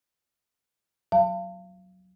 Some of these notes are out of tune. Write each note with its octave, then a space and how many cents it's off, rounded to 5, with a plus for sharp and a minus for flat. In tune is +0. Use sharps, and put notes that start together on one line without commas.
F#3 +0 F5 -30 A5 +40